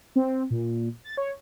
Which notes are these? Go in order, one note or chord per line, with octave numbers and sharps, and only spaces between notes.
C4
A#2
A6
C#5